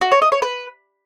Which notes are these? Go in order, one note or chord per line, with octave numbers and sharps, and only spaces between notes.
F#4
C#5
D#5
C#5
B4